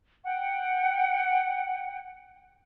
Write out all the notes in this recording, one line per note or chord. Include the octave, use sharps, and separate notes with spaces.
F#5 G5